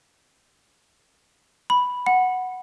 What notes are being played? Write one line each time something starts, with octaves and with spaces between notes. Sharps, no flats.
B5
F#5